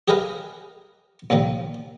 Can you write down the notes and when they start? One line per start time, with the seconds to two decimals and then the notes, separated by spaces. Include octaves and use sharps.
0.08 G4 G#4 A#4 B4 D#5 F5
1.30 C2 A#2 D#3 F3